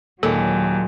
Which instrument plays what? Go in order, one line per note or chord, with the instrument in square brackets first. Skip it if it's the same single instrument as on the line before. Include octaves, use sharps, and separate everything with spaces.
[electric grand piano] D#2 [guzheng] A#2 G#3 [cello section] F#3 [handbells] A4